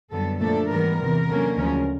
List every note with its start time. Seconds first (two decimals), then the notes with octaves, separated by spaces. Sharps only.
0.11 F#2 D3 G3 B3 A4
0.40 A#2 F3 A3 D4 A4
0.69 G#2 E3 G3 B3 A#4
0.99 E2 C3 E3
1.28 D3 F#3 A#3 C#4
1.57 D2 C#3 F3 G#3 C#4